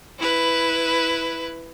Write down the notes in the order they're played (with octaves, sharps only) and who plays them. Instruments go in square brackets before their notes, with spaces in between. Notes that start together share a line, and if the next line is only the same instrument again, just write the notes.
[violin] E4 B4